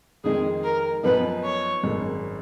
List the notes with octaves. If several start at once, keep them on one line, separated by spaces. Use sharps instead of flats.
F2 D#3 G#3 G#4
A#4
F#2 F3 B3 D#4 B4
C#5
G#1 F#2 D#3 G#3